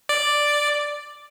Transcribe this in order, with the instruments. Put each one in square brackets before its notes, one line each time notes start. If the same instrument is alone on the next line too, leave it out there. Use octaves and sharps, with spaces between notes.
[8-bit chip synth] D5